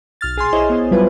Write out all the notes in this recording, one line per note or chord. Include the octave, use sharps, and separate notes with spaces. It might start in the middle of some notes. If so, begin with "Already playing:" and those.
B1 F6 A6
A#1 G#4 G#5 C6
E4 G#4 C5 C#5 D#5
B3 E4 C5
F#3 G3 E4 F4 B4